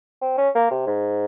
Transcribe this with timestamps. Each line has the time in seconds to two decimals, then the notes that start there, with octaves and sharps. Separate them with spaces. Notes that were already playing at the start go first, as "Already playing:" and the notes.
0.22 C4
0.38 C#4
0.55 A#3
0.71 C3
0.87 G#2